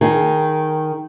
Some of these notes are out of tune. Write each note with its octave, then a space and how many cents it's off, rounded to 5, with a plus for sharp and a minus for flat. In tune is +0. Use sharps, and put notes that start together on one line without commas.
D#3 +0 G#4 +15